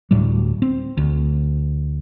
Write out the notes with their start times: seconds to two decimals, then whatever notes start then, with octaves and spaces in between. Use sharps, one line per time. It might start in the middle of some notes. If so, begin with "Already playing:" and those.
0.11 D2 A2 F#3 G3
0.62 C4
0.97 D2